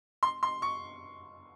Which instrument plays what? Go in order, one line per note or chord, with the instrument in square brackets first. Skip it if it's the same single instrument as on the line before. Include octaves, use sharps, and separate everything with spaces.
[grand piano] C6
C6
C#6